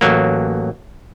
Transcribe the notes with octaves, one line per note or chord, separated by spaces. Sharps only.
A1 F#3 A#3